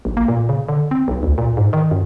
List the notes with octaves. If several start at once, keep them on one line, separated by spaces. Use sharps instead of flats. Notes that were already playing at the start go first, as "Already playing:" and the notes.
A#1
A#3
A#2
C#3
D3
C4
B1
D2
A#2
G#2
D#3
F#2